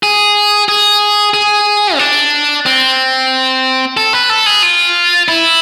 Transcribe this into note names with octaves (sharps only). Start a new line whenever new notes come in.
G#4
G#4
G#4
C4
D4
C4
A4
B4
A4
G#4
F4
E4